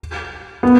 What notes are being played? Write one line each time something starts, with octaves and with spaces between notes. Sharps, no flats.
B3